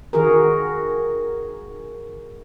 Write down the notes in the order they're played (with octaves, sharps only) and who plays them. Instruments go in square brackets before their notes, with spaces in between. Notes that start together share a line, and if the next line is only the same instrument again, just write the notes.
[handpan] D#3 F#4 G#4 A#4